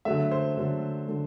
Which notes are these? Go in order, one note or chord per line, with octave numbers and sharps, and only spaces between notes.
D3 F#3 A3 E5
C5
D3 F#3 A3
D3 F#3 A3